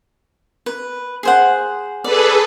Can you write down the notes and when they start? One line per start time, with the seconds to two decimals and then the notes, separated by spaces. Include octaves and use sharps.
0.66 B4
1.23 G#4 C5 F#5
2.04 G#4 A4 B4 D5